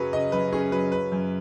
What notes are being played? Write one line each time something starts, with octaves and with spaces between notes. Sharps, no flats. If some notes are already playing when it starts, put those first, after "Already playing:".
Already playing: F#2 C#3 F#3 C#4 G#4 B4
C#3 D#5
F#2 B4
C#4 G#4
F#3 B4
C#3 B4
F#2